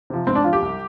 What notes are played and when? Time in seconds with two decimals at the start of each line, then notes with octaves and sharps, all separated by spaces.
0.10 C3 F3
0.27 G#2 C4
0.35 D4
0.44 F3 F4
0.53 G4
0.62 C2